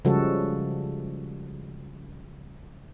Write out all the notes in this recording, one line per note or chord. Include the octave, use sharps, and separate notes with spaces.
C#3 F3 G3 G#3 F#4 A4